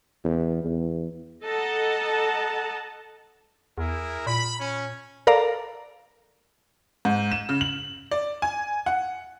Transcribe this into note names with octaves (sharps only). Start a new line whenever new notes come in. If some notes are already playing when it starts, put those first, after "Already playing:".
E2
E2
A4 D#5 F#5 A5 A#5
E2 E4 G#4 A#4
A#2 B5
C#4
A4 A#4 D5 F5 A#5
G#2
E7
C#3
F#7
D5
G#5
F#5